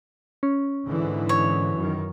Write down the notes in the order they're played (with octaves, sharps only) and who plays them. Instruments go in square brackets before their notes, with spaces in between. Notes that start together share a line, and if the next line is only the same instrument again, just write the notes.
[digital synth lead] C#4
[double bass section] G#2 D3 E3
[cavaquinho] C#5
[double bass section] F#2 D#3